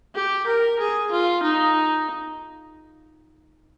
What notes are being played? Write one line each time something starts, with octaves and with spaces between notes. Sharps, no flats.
G4
A#4
G#4
F4
D#4